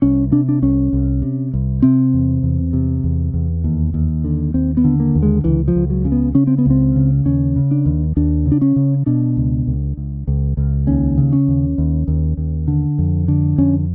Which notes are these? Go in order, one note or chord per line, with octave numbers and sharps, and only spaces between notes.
C2 C#4
C3 D4
D4
C2 C#4
C2
C3
C2
C3 C4
E2
E2
C3
E2
E2
D#2
D#2
D3
D#2 C4
B3
D3
A#3
D#2
G#3
C#2 E3
F3
C#2
F#3
C#3
B3
C#3 C#4
C4
B3
C#2 C4
C#3
D#2 C#4
C#3
D4
D#2
D#2 D4
C#3
D4
C#4
C#3
B2 D4
C#2
C#2
C#2
C#2
C#2
D#2 C#4
C#3
C#4
D#2
D#2
D#2
D#2
D3
F2
D3
F2 C#4